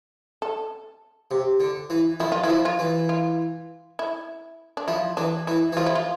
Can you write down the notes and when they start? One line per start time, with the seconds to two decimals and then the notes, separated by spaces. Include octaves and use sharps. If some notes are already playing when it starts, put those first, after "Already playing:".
0.42 A4
1.31 C3
1.60 D3
1.90 E3
2.20 F3 E4
2.32 F4
2.43 E3 E4
2.49 F3
2.65 F4
2.79 E3
3.09 F4
3.99 E4
4.77 D4
4.88 F3 E4
5.17 E3 D4
5.47 E3 E4
5.73 E3
5.77 F3 F4
5.86 E4
5.95 F4